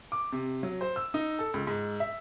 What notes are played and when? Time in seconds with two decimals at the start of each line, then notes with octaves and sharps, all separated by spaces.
0.12 D6
0.32 C3
0.63 F#3
0.81 C5
0.96 E6
1.14 D#4
1.39 A4
1.54 C#2
1.67 G#2
2.00 E5